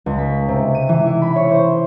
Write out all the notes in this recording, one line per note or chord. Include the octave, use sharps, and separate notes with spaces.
C#2
B6
C3
D#7
E3
E4
B5
C#5
C5